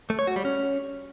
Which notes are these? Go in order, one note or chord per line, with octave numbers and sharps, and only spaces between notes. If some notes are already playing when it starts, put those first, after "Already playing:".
A3
C#5
F#4
G3
C#4